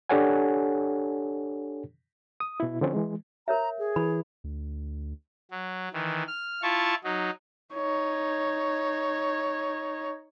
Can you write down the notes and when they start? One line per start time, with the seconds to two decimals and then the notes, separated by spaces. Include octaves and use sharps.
0.09 D4 G4 A4 C#5 F#5 G#5
2.40 D#6
2.60 B2 E4
2.81 D3 F3 C4 C#4
2.94 E3 G#3
3.48 A#4 C#5 E5 A#5
3.79 G#4
3.96 E3 B5
4.44 D2
5.51 F#3
5.93 D#3 E3
6.27 F6
6.62 E4 F4 A5 C#6
7.04 F#3 D#4
7.74 D#4 C#5